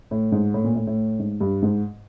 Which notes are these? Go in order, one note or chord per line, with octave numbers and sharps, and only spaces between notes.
A2
G#2
A2
A#2
A2
A2
G#2
G2
G#2